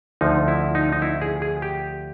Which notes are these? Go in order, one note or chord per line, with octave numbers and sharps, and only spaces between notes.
D2 D3 F3 D#4
E4
D#4
D#4
E4
G#4
G#4
G4